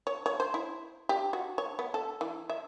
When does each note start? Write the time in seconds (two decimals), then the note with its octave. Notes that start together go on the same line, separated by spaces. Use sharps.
0.07 C#5
0.26 C#5
0.40 C5
0.54 E4
1.09 G4
1.33 F#4
1.58 C#5
1.79 B3
1.94 A4
2.21 E3
2.50 E5